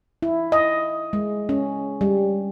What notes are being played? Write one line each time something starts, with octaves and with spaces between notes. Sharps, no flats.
E4
D#5
G#3
C#4
G3